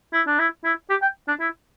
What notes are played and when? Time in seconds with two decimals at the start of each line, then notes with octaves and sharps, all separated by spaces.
0.13 E4
0.27 D4
0.39 E4
0.64 E4
0.90 G4
1.02 G5
1.28 D4
1.40 E4